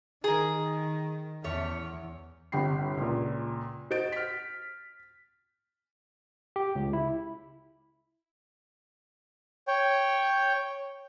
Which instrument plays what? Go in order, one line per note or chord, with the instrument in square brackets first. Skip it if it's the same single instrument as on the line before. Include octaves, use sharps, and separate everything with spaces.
[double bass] D#3 [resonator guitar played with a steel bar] G#4 A#4
[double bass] E2 [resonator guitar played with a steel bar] A3 C#4 C#5
[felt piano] G1 C3 G5 B5 C7
C#2 A#2
F#4 C5 D#5 G6 A6 D7
F6 B6
[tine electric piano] G4
C#2
E4
[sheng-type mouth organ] C#5 G5